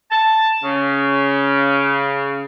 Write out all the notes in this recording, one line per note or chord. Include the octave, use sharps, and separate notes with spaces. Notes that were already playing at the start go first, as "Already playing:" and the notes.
A5
C#3